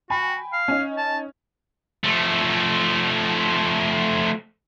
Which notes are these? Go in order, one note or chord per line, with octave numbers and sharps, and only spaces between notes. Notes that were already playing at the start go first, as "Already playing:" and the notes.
F#4 G5 G#5 B5
F5
C#4 D#4
A5
F3 A3